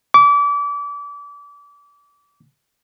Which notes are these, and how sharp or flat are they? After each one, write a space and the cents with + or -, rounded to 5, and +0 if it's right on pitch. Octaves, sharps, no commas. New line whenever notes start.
D6 -30